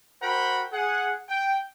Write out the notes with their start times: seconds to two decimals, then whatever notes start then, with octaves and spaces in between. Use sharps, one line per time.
0.21 F#4 A#4 C5 F#5 G5 B5
0.72 G#4 F#5
1.28 G5